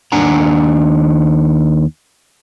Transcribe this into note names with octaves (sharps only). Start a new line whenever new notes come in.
D#2 D#3 D4 F#5 G#5 A#5